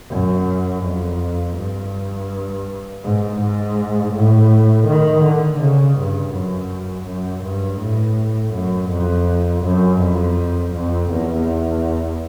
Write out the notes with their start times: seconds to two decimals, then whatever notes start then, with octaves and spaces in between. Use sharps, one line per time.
0.10 F#2
0.85 F2
1.57 G2
3.04 G#2
3.41 G#2
4.15 A2
4.88 D#3
5.24 D3
5.61 C#3
5.98 G2
6.34 F#2
7.08 F#2
7.45 G2
7.80 A2
8.54 F#2
8.90 F2
9.65 F#2
10.00 F2
10.74 F2
11.11 E2